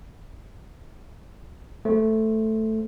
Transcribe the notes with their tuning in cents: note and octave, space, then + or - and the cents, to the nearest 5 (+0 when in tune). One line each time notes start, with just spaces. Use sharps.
A3 +0 C5 +0